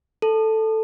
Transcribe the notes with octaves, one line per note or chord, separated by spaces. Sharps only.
A4